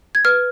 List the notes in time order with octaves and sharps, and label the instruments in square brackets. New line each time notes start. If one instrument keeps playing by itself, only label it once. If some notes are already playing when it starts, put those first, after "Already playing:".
[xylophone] G#6
B4 F6